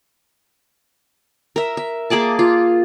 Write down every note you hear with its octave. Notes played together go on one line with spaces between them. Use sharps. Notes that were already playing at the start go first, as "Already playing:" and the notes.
A#4 E5
E5
A#3 G#4 D5 A5
F4